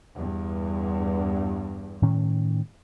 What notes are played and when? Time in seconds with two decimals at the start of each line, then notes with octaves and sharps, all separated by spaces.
0.15 E2 G2
2.02 A2 D#3 C#4